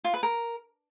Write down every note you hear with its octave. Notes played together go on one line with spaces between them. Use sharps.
F4
B4
A#4